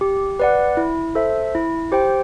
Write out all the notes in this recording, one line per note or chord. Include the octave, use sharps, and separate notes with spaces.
G4
B4 D5 F#5
E4
A4 C5 E5
E4
G4 C5 G5